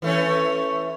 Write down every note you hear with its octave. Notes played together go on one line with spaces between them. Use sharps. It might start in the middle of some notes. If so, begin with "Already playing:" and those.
E3 A3 C#4